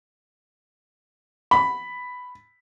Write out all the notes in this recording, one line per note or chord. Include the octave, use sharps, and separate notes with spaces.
B5